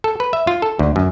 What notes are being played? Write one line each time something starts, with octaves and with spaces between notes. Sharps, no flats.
A4
B4
E5
F4
A4
D2
F#2